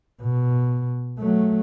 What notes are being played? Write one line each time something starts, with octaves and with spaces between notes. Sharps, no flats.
B2
F#3 A3